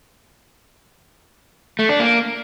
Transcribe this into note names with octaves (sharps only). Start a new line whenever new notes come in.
A3
D4
A#3